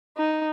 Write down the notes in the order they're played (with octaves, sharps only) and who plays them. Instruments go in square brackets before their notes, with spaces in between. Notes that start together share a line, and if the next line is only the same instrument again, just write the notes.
[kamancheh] D#4